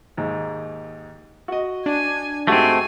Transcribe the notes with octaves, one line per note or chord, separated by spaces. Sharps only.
D#2 G#2
F#4 D#5
D4 G#5
G#2 A3 C4 F#4 G4 G#5